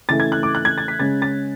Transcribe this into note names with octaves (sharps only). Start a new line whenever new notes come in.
C#3 E3 A3 A6
G#6
F#6
D6
F#6
G#6
A6
B6
C#3 G#3 C#4 A6
A6